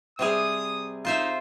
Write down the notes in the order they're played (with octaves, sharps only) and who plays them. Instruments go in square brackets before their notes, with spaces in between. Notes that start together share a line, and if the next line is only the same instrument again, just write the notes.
[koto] C3 G3 G#4 [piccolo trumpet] D#6
[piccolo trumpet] D#4 [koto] F4 C5 E5